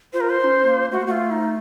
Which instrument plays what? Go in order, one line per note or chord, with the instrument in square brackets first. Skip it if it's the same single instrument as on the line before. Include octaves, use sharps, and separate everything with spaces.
[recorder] F4 [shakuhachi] C5
[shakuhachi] A#4
C5
[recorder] F4
C#4
A#3
[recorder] A3 [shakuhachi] F#4
[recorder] A#3
[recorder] A3 [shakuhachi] F4 F#4
[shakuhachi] D#4